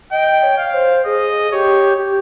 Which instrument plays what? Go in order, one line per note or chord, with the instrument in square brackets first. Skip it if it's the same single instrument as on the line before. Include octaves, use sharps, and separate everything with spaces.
[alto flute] D#5 [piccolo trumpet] G5
[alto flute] C#5
[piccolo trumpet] F5
[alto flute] C5
[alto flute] G#4 [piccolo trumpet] D#5
[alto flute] G4 [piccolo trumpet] C#5
[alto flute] G4